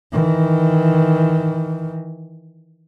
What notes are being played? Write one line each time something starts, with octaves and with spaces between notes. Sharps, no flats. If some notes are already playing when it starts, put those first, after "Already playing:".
D#3 E3